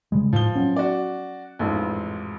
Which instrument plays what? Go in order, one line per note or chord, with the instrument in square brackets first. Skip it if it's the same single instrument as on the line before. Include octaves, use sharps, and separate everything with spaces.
[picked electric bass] C#3 G3 G#3
[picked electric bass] A2 [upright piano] F3 G7
[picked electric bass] F#3 B3 C#4
[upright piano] F#4 D5
A1 F2 G#2